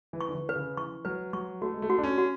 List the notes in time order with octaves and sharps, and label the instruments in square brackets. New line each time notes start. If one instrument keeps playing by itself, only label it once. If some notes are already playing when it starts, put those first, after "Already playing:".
[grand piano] E3
[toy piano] C#6
[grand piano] D3
E3
[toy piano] B4
[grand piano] C#3
[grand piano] E3 [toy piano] C#6
[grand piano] F#3 [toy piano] B4
[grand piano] F#3 [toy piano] C#6
[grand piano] A3 [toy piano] F#4
[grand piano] G#3
A3
[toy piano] F#4
[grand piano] D4
C#4
[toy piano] F#4